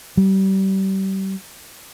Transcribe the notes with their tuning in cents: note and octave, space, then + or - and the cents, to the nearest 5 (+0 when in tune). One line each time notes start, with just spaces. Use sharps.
G3 -30